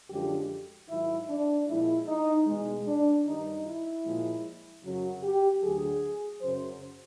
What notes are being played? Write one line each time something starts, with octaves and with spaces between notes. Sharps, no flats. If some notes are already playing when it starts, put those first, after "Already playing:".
F#2 D3 F3 G#3 G4
G#2 D#3 F#3 E4
D4
A#2 F3 G#3 E4
D#4
E2 B2 G#3
D4
G2 D#3 G3 D#4
E4
A#2 F3 G#3
F#2 C#3 F#3
G4
D2 D3 F#3 G#4
F#2 C#3 F#3 C5